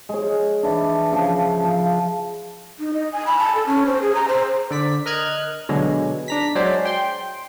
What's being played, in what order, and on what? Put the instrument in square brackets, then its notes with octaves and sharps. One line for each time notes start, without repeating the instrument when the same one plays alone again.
[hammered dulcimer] G#3 C#5
E3 D4
C#3 F3
F3
[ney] D#4
D#5
G#5
B5
A5
A4
C#4
C5
G#4
A#5
C5
[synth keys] D3 D5 B6
A#4 D#5 F6 F#6 G#6
B2 D3 F#3 G#3
D4 A#5 B6
F#3 G#3 C5 D5
G5 C6